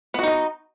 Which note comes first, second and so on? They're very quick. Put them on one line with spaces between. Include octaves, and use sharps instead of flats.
B3 F#4 D#4 D#5